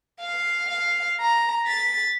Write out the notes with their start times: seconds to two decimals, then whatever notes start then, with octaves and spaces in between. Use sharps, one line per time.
0.20 F5
0.69 F5
1.20 A#5
1.66 A6 B6